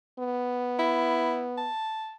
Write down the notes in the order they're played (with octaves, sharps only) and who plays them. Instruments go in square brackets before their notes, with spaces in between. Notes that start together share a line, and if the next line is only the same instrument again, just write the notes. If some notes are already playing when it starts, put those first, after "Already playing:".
[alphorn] B3
[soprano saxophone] E4
A5